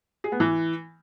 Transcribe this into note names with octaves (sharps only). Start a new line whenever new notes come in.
G#4
B3
E3